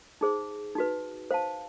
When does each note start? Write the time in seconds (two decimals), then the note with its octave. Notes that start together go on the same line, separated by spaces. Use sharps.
0.21 D#4 G#4 C5
0.75 D#4 F#4 B4
1.31 C5 F5 A5